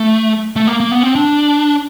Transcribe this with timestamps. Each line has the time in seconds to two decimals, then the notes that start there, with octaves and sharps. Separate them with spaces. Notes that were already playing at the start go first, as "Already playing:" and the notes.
Already playing: A3
0.56 A3
0.67 A#3
0.80 A#3
0.92 B3
1.03 C4
1.15 D4